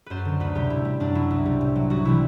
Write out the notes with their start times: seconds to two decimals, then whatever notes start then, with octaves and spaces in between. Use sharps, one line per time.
0.06 F#2 B4 C5
0.25 D3 F#3
0.40 D2 B4
0.55 C3 G3 G4
0.70 A2 E4
0.85 G3
1.00 F#2 D4
1.15 F#3 E4
1.31 C2
1.45 C3 G3
1.61 A2
1.76 F#3
1.90 C2 F#4
2.05 C3 E3 G3 E4